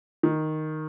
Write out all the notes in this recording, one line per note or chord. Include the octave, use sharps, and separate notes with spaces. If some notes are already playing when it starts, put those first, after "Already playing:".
D#3